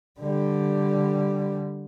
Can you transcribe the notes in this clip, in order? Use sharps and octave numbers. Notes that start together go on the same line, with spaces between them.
D3 G3